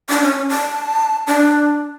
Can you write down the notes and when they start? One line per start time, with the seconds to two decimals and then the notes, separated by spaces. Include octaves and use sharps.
0.09 D4
0.22 C#4
0.49 A5
1.27 D4